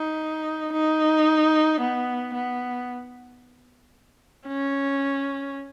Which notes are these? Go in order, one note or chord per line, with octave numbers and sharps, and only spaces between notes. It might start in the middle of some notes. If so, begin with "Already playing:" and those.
Already playing: D#4
D#4
B3
B3
C#4